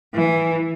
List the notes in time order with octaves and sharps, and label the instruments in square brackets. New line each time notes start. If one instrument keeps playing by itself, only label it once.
[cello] E3